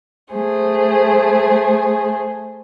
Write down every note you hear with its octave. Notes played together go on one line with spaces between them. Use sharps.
A3 G#4 C5